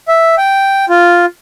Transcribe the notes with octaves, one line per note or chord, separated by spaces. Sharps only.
E5
G5
F4